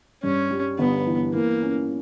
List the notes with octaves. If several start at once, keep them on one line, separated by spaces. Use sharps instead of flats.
G2 C#4
G3
G1 B3
E3
E3 A#3
C#4